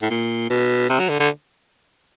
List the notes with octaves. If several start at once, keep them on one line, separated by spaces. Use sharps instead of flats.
A2
A#2
B2
C3
F#3
D3
D3